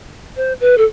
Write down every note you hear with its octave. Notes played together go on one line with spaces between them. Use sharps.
C5
B4
A4